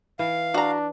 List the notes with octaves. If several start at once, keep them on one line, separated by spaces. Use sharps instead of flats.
E3 F5
D4 F#4 A#5